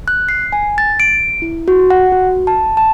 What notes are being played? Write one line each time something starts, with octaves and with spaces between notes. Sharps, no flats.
F#6
C7
G#5
A6
D7
E4
F#4
F#5
F#4
A5
A5